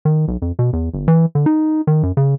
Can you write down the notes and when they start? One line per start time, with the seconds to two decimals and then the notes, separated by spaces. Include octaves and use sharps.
0.05 D#3
0.28 B1
0.42 F2
0.59 B2
0.73 E2
0.94 G1
1.08 E3
1.35 D3
1.46 D#4
1.87 D#3
2.03 F#2
2.17 C#3